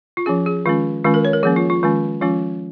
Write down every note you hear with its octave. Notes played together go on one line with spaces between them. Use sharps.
F4
F3 C#4 G#4
G#4
D#3 G#3 C#4 F4
D#3 G#3 C#4 F4
A#4
C#5
A#4
F3 A#3 C#4 G#4
F4
F4
D#3 G#3 C#4 F4
F3 G#3 C#4 F4